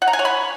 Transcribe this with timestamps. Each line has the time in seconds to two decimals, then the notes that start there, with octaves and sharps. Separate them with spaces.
0.02 F#5
0.08 A#5
0.13 G#5
0.19 C#5
0.25 B5